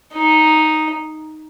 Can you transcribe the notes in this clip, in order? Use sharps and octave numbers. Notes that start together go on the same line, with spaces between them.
D#4